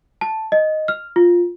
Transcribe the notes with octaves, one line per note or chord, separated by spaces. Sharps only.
A5
D#5
F6
F4